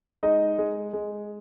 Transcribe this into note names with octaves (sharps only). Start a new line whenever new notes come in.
G#3 D#4 D#5
G#3
G#3